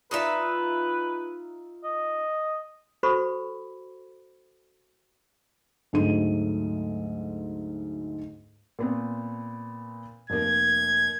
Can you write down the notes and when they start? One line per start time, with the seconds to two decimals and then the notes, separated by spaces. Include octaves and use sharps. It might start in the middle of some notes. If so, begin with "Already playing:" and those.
0.11 D#4 F4 B4 E5
1.84 D#5
3.03 F#4 A4 C5 B5 C#6
5.93 D2 G#2 F#3 A3 D#5 D#7
8.79 A#2 B3 C4
10.30 F1 A#3 G#6